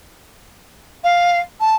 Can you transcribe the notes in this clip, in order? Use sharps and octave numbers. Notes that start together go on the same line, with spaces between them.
F5
A5